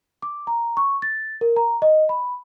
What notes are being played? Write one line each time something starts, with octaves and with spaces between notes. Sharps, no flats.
D6
A#5
C#6
A6
A#4
A#5
D#5
B5